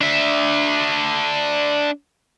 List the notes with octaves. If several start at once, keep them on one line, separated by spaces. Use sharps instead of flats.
D4 E5